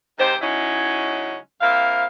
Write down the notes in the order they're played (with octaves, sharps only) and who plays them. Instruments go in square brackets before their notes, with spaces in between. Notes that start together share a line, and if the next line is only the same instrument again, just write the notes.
[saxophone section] G#2 C3 D#3 G4 C5
C#3 F#3 G#3 C#4 D#4 E4
C3 A#3 C4 E4 F5